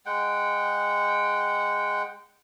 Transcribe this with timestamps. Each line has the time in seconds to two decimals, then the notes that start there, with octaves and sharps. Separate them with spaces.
0.06 G#3 F#5 G5